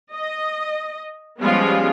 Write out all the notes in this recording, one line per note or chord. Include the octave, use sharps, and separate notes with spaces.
D#5
F3 G3 G#3 B3 C#4 F4